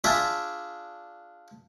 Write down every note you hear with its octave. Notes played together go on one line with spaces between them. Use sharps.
D4 F4 G#4 D5 E5